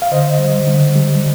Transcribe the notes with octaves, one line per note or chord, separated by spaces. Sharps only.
F5
D3 C5 D#5
G3
D3
G3